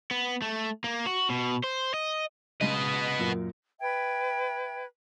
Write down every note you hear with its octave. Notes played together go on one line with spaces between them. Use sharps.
B3
A3
A#3
F#4
B2
C5
D#5
C#3 G#3 B3 D#5
F#2 A#2 A#4
B4 E5 G5 G#6